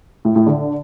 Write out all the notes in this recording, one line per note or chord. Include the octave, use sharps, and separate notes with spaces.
A2
A2
D3